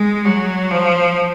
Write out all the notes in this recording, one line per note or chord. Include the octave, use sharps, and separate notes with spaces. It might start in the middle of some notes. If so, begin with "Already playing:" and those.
Already playing: G#3
F#3
F3